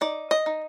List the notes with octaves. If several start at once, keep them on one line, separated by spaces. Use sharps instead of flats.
D#4 D5
D#5
D#4